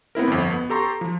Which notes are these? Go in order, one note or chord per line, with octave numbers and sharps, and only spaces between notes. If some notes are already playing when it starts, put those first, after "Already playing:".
B3 C4 E4 A#4
G1 F2
B3
G4 A4 A#5 C6 C#6
F3